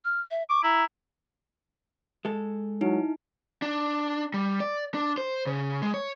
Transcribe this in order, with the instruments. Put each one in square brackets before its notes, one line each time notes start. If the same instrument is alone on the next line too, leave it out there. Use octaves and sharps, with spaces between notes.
[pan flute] F6
E5
[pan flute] C#6 [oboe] D6
[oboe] E4 [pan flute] A#5
[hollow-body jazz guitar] G#3 A4
[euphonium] F#3 [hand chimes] D#4 E4
[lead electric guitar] D4
G3
D5
D4
C5
C#3
G#3
C#5